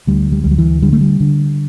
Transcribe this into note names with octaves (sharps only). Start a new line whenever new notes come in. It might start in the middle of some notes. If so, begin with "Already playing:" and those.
D2 G3
G3
D2 G3
F#3
E3
D3 G3
A3
G3
D3